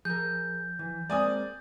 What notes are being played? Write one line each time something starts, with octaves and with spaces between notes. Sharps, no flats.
F3 G#4 A#4 G6
E3
G#3 A#3 C4 D5 G#5 D#6